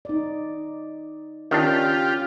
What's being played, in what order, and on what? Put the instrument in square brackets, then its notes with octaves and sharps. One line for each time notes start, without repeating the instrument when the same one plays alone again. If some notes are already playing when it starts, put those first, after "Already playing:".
[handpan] D#4 D5
[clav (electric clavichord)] D#3 D4 [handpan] C#4 [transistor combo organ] F4 G4